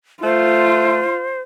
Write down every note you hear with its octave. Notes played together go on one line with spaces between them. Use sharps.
A3 F4 C5